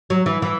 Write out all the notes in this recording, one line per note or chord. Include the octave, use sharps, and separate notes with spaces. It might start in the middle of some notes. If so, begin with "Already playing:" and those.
F#3
E3
E3